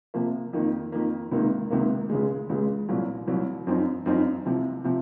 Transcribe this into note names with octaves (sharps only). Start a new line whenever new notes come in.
C3 F3 A#3
F2 D#3 A#3
F2 D#3 A#3
C#2 C3 D#3 A#3
C#2 C3 D#3 A#3
C#2 C#3 G#3
C#2 C#3 G#3
C2 A#2 F#3
C2 A#2 F#3
F#2 F3 C4 D#4
F#2 F3 C4 D#4
C2 C3 F3
C3 F3